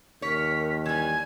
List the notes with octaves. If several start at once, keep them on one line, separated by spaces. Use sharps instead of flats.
D#2 A#4 C#5 B6
E3 G3 G#5 G#6